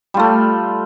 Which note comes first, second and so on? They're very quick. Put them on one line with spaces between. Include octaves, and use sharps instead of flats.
G3 F4 A3